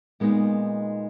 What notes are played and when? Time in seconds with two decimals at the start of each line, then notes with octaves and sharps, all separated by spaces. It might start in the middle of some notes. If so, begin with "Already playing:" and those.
0.20 A#2 G#3 B3 D#4